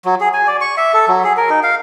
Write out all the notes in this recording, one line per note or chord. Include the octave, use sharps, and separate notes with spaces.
F#3
G#4
G#5
D5
C#6
E5
A4
F#3
G#4
A#4
D#4
F5